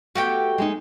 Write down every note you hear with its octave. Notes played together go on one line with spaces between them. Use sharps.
A3 B3 F#4 G4 G5
G#3 A#3 D#4